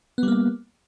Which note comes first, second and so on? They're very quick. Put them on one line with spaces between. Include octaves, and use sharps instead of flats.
B3 G3 A#3